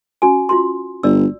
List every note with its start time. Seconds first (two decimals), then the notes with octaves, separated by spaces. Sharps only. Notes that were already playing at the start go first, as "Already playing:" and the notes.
0.22 C#4 F#4 G#5
0.49 F4 F#4 C6
1.03 G1 D5 E6